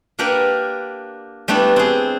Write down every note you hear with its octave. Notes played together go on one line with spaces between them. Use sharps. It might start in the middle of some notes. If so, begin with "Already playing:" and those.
A#3 D4 G4 A#4 B4 F#5
G3 A3 B3 D4 E4
C4 G#4